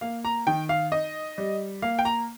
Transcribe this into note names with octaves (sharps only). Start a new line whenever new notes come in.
A#3 F5
A#5
D#3 G5
F5
D#4 D#5
G3
A#3 F5
G5
A#5